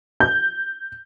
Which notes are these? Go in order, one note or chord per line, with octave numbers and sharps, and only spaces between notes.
G6